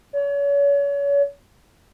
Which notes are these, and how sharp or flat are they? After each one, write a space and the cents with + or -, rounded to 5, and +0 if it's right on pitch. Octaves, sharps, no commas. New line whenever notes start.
C#5 +35